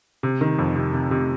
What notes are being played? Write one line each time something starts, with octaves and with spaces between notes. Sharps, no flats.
C3
D#3
F2
C3
C3
C3